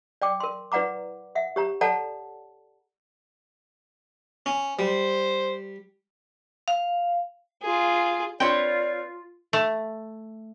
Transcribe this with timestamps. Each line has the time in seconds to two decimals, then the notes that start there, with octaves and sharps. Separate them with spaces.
0.22 D5 G5 D6
0.40 A#4 C6
0.72 E4 B4 D5 F#5 A#5 D6
1.35 E5 F#5
1.56 G4 C#5 A#5
1.81 A4 C#5 D5 F#5 A5 A#5
4.46 C#4
4.79 G3 C5
6.68 F5
7.62 F4 G#4
8.40 C4 F4 B4 C#5 D5 G5
9.53 A3